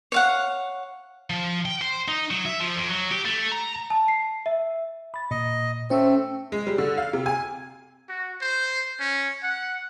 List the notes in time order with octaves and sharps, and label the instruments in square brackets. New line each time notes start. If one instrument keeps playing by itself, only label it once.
[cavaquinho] C#5 F5 F#5
[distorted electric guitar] F3
G5
C5
D#4
F#3
E5
F3
F2
F#3
G4
A3
A#5
[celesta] A5
C7
E5
[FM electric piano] B5 A6
[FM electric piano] A#2 [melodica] D#5
[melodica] A3 C4 [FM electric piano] C#4 C5
[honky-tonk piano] G#3
G3
D3
F5
C3
G#5
[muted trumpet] F#4
C5
C#4
F#5